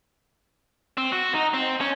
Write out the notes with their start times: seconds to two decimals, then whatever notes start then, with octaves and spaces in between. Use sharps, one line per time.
0.97 C4
1.12 F#4
1.34 D#4
1.54 C4
1.81 C#4